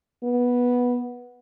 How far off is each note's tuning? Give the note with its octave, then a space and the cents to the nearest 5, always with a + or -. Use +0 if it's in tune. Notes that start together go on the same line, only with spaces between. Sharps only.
B3 -10